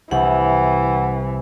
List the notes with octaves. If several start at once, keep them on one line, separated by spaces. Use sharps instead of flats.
C2 E3 F#5